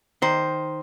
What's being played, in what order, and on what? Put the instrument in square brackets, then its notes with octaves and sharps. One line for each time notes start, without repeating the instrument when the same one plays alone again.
[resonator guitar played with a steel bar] D#3 C5